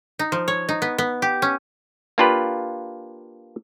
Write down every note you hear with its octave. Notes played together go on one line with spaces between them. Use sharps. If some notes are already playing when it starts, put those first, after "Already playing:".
D#4
F3
C#5
D#4
B3
B3
G4
C#4
A#3 D4 F4 G4 B4